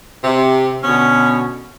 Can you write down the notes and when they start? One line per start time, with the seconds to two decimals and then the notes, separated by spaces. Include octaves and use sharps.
0.23 C3
0.84 B2 D3 B3 C#4